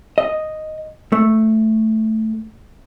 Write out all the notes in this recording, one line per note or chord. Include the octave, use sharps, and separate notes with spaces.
D#5
A3